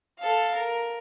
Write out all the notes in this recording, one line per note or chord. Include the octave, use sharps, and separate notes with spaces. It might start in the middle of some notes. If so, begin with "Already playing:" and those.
A4 F5
A#4